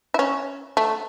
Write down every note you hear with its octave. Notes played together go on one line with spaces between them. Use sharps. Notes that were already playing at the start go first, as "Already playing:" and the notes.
E4
C#4
A3